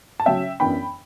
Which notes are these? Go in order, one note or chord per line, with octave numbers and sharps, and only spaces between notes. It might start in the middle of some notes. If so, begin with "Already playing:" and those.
A5
C#3 F#3 C#4 E5 G5
F#2 E3 B3 D4 G5 B5